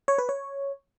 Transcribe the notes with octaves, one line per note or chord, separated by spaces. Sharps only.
C#5
B4
C#5